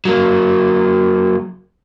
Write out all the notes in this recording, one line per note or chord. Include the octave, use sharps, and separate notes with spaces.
F#3 A#3